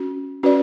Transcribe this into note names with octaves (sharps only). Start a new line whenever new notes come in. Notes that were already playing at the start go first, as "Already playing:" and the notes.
Already playing: C#4 F#4
C#4 F#4 B4 D5